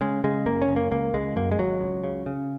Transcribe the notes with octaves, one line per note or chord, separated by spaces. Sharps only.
C#3 G#3
C#3 G#3
F#1 A#3
C#4
F#1
A#3
C#2 A#3
C#2 G#3
F#2 A#3
G#3
G#1 F#3
C#2
C#3
C#3